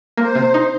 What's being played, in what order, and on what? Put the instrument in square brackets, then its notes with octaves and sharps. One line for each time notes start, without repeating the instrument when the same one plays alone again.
[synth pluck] A#3 [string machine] C5
[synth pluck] C3
D#4